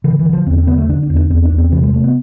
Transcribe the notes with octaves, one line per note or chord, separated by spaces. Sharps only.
D3 E3
E3
D3
F3
E2 C4
C4
D3 B3
A3
D3 D4
D4
E2
D4
E2 C4
D4
E2
C4
C3 E3
G#3
C3 A3
B3